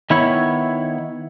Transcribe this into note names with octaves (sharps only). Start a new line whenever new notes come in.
D#3 B3 E4 C#5